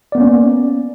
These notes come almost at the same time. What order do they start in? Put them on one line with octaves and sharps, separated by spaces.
D5 B3 A#3 C#4